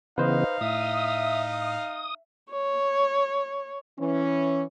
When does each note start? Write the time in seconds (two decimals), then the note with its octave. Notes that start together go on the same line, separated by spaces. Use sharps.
0.18 C#3 E3 B3 D#4 B4 C5 D#5 F5
0.61 A2 E5 D#6
2.52 C#5
3.99 E3 C#4